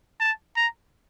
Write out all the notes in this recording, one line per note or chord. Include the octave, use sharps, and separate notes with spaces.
A5
A#5